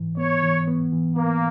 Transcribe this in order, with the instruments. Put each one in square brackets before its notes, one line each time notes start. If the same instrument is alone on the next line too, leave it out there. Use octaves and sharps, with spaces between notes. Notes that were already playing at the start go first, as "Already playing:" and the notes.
Already playing: [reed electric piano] G#2 E3
[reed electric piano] B3 [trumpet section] C#5
[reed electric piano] E3
B3
E3
[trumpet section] A#3 [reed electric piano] B3